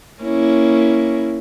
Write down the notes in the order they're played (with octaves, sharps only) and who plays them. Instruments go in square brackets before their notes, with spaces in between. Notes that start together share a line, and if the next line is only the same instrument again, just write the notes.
[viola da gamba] A#3 C#4 E4